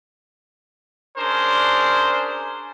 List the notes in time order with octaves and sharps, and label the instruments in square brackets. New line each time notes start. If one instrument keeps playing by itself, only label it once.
[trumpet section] C#4 D4 G#4 A#4 C5